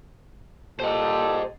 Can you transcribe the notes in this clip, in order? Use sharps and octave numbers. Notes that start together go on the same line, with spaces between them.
A#2 G4 A4 C5 D#5